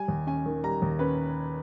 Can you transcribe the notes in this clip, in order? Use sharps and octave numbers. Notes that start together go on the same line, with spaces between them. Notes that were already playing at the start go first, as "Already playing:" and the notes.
Already playing: G3 G#5
D#2
C#4 G#5
D#3
G3 A#5
D#2
C#4 B4